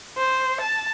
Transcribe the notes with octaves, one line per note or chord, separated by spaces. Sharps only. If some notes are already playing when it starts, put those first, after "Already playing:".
C5
A5